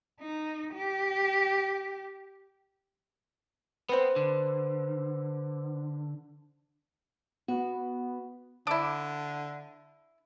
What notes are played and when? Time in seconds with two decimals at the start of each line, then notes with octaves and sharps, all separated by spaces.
0.21 D#4
0.74 G4
3.89 B3 C4 B4 C5
4.16 D3
7.48 B3 F#4
8.67 D3 D4 E4 D6 D7